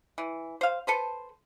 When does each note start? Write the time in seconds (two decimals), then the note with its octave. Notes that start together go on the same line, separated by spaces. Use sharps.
0.18 E3
0.61 C5 F5
0.87 A4 B4 C5